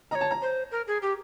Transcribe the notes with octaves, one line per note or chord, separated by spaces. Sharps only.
C#5 D#5 A#5
A5
A#5
C5
A#4
G#4
G4